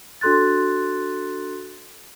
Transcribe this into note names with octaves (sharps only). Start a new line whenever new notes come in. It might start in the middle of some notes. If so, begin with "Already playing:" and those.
D4 F#4 A4 C6 F#6 A6